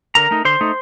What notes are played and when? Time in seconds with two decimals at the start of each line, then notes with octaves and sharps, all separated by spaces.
0.15 D3 A#4 A#5
0.31 A3 D#4
0.45 D3 C5 C6
0.61 A3 D#4